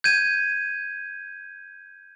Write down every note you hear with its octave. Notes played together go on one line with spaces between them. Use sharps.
G6 G#6 D#7